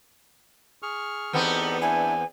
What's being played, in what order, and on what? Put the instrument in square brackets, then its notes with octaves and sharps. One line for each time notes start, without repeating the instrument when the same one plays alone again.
[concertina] G#4 C#6 F6
[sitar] E2 B3 C4 [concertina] D#4 G4 A4
[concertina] D4 E4 [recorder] G#5